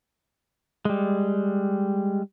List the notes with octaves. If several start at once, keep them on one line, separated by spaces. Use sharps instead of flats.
G3 G#3